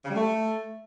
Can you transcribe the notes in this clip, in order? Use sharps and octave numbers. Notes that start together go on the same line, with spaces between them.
C#3
G3
A3